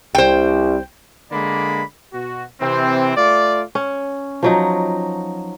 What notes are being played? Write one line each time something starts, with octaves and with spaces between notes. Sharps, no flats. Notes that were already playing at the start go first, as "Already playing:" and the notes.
C2 C5 G5
D3 G#3 A#3 D5 B5
B2 F#4
C3 E3 C4
A3 F4 D5
C#4
F3 F#3 D#4